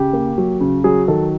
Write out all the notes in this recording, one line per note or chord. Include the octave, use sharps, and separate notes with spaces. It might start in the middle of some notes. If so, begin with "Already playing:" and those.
Already playing: C#3 G4
A#3
F#3
C#3
F#3 G#4
D#3 A4